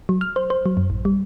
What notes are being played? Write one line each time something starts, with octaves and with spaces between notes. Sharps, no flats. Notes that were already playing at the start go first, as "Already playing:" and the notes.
F#3
F6
C5
C5
F#3
F#2
A1
G3